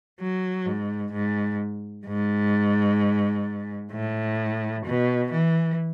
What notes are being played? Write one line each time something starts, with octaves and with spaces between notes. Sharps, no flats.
F#3
G#2
G#2
G#2
A2
B2
E3